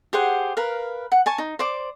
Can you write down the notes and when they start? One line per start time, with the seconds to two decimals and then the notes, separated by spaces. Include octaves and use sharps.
0.13 G4 G#4 C5 F#5
0.57 A#4 B4 F5
1.12 F#5
1.26 G#5 A5 C#6
1.38 D#4
1.59 C5 D5 D6